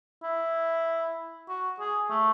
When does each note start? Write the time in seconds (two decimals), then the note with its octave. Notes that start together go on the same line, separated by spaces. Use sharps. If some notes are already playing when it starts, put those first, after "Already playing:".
0.23 E4
1.49 F#4
1.80 G#4
2.10 A3